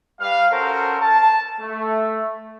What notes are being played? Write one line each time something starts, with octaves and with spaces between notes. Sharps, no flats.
G3 B4 F5
C#4 F#4 A4 A#4 C5
A5
A3